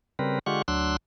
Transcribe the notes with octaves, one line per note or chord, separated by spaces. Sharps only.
C#3 G3 C4 A#4 B4
D3 G#3 F4 G4 F#5 C#6
D2 F#3 D4 C6 E6 F#6